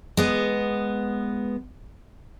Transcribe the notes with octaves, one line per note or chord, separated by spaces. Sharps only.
G#3 B3